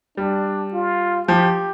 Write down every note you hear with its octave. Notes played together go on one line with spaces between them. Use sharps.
G3 D4
F4
F3 G4